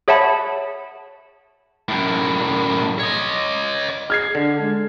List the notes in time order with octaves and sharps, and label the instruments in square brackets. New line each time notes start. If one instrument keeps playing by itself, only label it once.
[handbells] G#4 C#5 E5 F#5 A5 B5
[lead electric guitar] F#2 A2
C#5 D#5
[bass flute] G#4 [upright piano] F6 G#6 C7
[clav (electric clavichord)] D3 [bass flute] D4
[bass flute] G#3